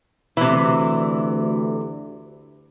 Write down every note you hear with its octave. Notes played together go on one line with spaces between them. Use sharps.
D2 C3 E3